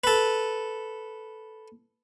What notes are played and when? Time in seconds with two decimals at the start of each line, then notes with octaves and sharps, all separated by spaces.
0.04 A4 B4